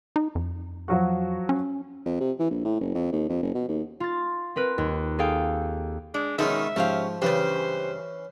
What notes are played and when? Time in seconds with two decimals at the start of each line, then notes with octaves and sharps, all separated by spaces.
0.16 D#4
0.35 F2
0.88 F3 F#3 F#4
1.49 C#4
2.06 F2
2.21 C3
2.39 E3
2.51 A#1
2.65 A2
2.81 F#1
2.95 F2
3.12 D#2
3.29 F2
3.42 F#1
3.55 B2
3.68 D#2
4.00 F4 A6
4.56 C4 A#4 B4
4.78 D#2
5.19 G#4 A4 F5 G5
6.14 G#3 D4
6.39 B2 D#3 G#3 B3 C#4 D#4 E5
6.76 G#2 F3 C#4 G4 F5
7.22 G2 C#3 E3 C#4 G4 B4 C5